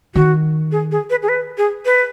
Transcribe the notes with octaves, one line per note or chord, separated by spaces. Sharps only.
D#3 F#4
G#4
G#4
B4
G#4
B4
G#4
B4